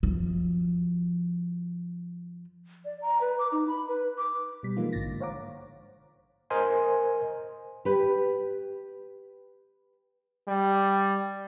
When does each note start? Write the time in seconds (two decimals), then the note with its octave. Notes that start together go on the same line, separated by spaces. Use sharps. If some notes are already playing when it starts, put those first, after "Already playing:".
0.03 F#2 F3
2.85 D5
3.02 A#5
3.21 B4
3.39 D6
3.52 D#4
3.68 B5
3.88 B4
4.18 D6
4.63 B2 G3 B6
4.77 E3 F3 G#3 A#3 D#4 F4
4.93 A1 G#2 D3 A6 A#6
5.07 D3
5.20 C5 C#5 F5 F#5 A#5 D6
6.50 A#4 C5 D#5 G#5 C6
7.85 G4 B4
10.48 G3